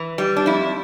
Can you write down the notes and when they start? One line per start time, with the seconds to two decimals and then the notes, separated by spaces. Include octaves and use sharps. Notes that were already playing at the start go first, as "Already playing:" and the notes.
Already playing: E3
0.18 G3
0.36 D4
0.46 F2 E4